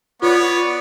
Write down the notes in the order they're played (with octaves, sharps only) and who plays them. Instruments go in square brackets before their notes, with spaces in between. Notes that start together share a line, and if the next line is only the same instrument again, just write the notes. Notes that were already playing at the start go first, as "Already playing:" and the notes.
[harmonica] B3 C#5 D5 [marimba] F4